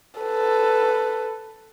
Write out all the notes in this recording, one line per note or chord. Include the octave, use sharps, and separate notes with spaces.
A4 B4